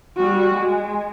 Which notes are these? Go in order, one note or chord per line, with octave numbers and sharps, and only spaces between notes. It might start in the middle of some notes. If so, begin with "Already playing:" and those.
G3 F#4
G#3